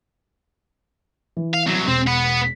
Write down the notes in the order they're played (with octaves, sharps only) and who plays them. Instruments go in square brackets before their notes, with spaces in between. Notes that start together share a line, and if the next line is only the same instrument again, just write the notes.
[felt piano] E3
[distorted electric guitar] F5
C2 F#3
[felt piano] E1 [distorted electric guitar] C4
[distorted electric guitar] B3 F#5